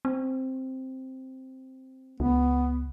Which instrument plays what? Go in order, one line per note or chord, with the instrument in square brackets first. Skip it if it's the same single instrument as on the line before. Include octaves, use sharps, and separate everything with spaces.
[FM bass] C4
[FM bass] C#2 [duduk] B3